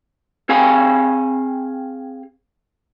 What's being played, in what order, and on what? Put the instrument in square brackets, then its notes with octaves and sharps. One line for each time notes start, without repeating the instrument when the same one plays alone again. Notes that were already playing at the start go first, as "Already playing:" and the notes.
[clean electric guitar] C4 G#4 F5 G5 G#5